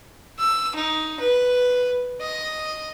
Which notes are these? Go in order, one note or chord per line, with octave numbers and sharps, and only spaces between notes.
E6
D#4
B4
D#5